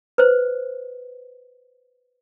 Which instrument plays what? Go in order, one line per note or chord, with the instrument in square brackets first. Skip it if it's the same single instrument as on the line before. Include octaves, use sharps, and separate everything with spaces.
[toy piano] B4 C5